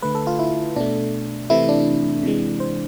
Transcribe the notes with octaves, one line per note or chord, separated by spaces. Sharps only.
D3 A3 B4
A4
F4
E4
B2 A3 D4
C3 E3 A3 E4
D4
C3 E3 G#3
C5